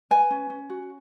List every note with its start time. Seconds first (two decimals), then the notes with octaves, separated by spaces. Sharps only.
0.11 B4 G#5
0.30 C#4
0.50 C#4
0.70 F#4